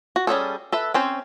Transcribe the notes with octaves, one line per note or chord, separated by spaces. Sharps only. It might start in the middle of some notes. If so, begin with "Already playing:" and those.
F#4
G3 C#4 G#4 A4
A4 B4 E5
C4 C#4 C5